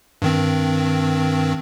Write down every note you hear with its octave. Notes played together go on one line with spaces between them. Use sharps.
G2 D#3 C4